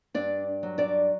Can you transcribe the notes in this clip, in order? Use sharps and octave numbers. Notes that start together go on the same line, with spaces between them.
G2 D4 D5
F#3
D4 D5